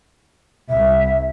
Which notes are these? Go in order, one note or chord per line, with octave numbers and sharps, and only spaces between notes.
C2 E5